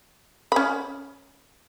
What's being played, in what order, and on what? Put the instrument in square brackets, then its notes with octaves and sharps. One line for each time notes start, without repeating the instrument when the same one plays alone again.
[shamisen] C#4 B5